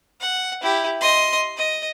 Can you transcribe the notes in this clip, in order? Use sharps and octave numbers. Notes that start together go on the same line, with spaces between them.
F#5
E4 G4
D#5 C6
D#5